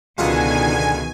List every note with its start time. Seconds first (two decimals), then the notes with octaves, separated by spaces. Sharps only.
0.18 C#2 B2 D3 D#3 F4 F#5 G#5